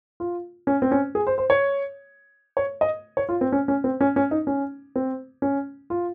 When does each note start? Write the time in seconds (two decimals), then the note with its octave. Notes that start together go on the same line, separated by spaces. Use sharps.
0.20 F4
0.67 C#4
0.82 C4
0.91 C#4
1.15 G#4
1.27 C5
1.38 C5
1.50 C#5
2.57 C#5
2.81 D#5
3.17 C#5
3.29 F4
3.41 C4
3.52 C#4
3.68 C#4
3.84 C4
4.01 C#4
4.16 C#4
4.31 D#4
4.47 C#4
4.96 C4
5.42 C#4
5.90 F4